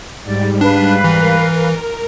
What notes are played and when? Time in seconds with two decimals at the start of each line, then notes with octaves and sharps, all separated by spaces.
0.24 G#2 G3 D5
0.61 D4 B4 F5
1.04 E3 A#4